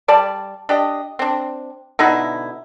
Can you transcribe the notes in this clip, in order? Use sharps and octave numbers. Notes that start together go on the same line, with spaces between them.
G3 D5 A5
D4 G4 D#5
C4 D4
B2 D3 D#4 E4